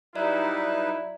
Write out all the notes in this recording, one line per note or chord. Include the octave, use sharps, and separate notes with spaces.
F#3 G3 D#4 E4 B4 D5 E5 A#5